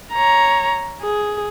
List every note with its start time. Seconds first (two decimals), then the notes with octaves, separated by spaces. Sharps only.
0.13 C#5 A#5
1.02 G#4